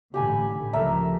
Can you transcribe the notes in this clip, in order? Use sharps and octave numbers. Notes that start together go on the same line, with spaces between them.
A1 D3 G4 G#5 B5
C#2 F3 A3 A#4 E5